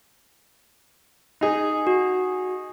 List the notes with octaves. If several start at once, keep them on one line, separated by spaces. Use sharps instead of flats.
D#4 G#4
F#4